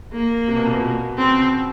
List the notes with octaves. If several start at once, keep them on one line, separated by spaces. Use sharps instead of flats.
A#3
C3
B2
A#2
B2
C#3 C4